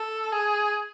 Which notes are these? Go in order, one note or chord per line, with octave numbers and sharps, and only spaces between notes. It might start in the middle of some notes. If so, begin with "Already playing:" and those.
Already playing: A4
G#4